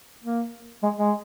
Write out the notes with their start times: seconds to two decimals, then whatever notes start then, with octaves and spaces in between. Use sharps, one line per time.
0.24 A#3
0.83 G#3
0.98 G#3